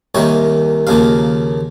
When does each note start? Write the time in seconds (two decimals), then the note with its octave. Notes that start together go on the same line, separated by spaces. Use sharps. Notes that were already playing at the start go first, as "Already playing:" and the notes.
0.15 C2 C3 D#3 A#3 C#5
0.87 D#2 C#3 F3 A#3 F5